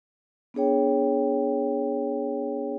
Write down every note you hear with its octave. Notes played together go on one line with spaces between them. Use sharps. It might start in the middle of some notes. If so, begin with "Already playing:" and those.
B3 D4 G#4 C#5 G5